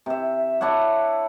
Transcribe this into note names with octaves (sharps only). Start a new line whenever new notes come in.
C3 E5
D4 E4 C#5 F#5